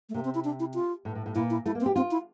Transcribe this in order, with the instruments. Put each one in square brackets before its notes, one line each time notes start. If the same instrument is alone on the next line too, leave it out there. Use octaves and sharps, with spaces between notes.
[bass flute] A3
[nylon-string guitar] C3 [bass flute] A#3
[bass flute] C4
E4
D4
E4
F4
[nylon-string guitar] A2
A2
A2
[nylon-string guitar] A#2 [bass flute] E4
[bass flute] E4
[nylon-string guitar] A3 [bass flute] E4
[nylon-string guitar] A#3
[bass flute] C4
[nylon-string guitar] G4
[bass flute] C4 [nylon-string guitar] F4
[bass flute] E4